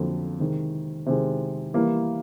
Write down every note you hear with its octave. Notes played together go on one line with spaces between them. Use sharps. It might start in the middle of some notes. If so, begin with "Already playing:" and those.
Already playing: F2 D3 F#3 A#3
C3 D#3 G#3
C3 D#3 G#3
E3 G3 A#3